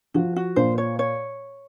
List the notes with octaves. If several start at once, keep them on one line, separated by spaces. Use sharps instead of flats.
F3 F#4
F#4
A#2 C5
C#5
C#5